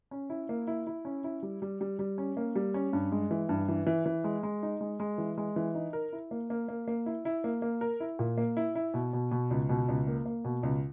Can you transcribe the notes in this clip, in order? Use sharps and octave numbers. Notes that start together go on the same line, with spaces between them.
C#4
E4
A#3
E4
E4
C#4
E4
G3
G3
G3
G3
C#4
A#3
G3
C#4
G2
G#3
E3
G2
E3
E3
E3
G#3
G#3
D#4
G#3
G#3
E3
G#3
E3
D#4
A#4
E4
A#3
A#3
A#3
A#3
E4
E4
A#3
A#3
A#4
E4
A#2
A#3
E4
E4
B2
B2
B2
C#2
B2
C#2
A#3
A#3
B2
C#2